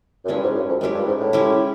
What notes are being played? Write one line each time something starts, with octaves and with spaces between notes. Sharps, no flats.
F#2
G2 G#3 C#4 E4 G4
G#2
F#2
F2
F#2 G#3 C#4 E4 G4
G2
G#2
A2
G#3 C#4 E4 G4